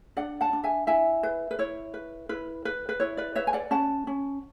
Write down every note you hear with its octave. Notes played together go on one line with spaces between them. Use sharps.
D4 D5 F#5
F#5 A5
D4
E5 G#5
E4 E5 G#5
B4
B4
E4 C#5
B4
E4 B4
B4
B4
E4 C#5
B4 D5
B4 C#5 E5
G#5
D5 F#5
C#4 F#5 A5
C#4